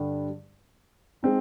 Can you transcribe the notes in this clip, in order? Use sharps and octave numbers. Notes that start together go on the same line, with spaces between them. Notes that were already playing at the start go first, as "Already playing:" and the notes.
Already playing: G2 D3 G3
G#3 C4 D#4